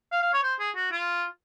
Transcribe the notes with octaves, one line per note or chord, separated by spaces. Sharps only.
F5
F5
C#5
C5
G#4
F#4
F4